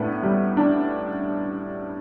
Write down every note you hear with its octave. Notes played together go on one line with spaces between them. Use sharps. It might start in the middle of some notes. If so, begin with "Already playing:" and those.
Already playing: A2 B3 D4
G3
D4